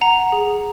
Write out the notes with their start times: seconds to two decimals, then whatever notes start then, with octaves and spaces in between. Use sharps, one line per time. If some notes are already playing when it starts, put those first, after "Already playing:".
0.01 F#5 A#5
0.32 G#4